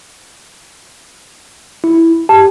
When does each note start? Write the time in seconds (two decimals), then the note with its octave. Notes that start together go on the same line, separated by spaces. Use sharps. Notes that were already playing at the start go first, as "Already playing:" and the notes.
1.84 E4
2.29 G4 A5